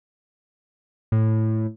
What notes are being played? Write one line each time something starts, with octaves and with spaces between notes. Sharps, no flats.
A2